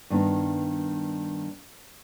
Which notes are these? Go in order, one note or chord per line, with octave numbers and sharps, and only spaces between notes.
G2 D#3 B3 D#4